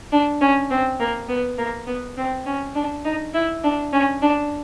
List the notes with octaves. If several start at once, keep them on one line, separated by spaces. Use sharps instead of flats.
D4
C#4
C4
A#3
B3
A#3
B3
C4
C#4
D4
D#4
E4
D4
C#4
D4